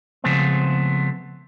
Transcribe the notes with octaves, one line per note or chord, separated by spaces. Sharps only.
C#3 F3 G#3 A3 B3 C4